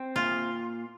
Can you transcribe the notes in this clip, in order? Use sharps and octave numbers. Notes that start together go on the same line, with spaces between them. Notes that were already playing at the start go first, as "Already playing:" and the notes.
Already playing: C4
A#2 F4